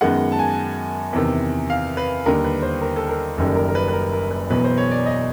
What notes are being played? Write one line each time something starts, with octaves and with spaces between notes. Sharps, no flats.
F#2 D#3 G#3 B3 F#5
A5
G#5
E2 C3 D#3
F5
B4
D#2 D3 G3 A#4
B4
C5
A#4
A4
A#4
F#1 F#2 D#3 G3 A4
A#4
A#4
B4
B4
A#4
A#4
B4
E1 E2 B2 F#3 B3 B4
C5
C#5
D5
D#5